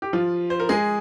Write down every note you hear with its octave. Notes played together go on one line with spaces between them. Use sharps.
G4
F3 F4
C5
A#4
G#3 G#4